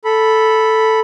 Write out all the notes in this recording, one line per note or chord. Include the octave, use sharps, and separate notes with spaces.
A4 B5